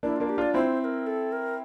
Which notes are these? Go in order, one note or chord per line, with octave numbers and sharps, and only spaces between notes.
A#3 D4 E4
A#3 D4 F4
G4
D4 F4 D5
C4 E4 C5
C5
A#4
A4
A#4